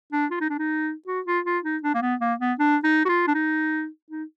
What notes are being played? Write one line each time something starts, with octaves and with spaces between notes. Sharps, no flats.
D4
F4
D#4
D4
D#4
F#4
F4
F4
D#4
D4
A#3
B3
A#3
B3
D4
D#4
F#4
F4
D4
D#4
D#4